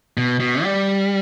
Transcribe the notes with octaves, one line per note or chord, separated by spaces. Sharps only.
B2
B2
G3